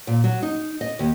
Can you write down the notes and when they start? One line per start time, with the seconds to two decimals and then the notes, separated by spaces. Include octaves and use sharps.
0.07 A#2
0.24 F#3
0.43 D#4
0.81 D#5
0.99 D#2